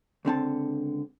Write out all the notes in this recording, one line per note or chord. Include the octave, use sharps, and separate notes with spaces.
C#2 D3 C4 A5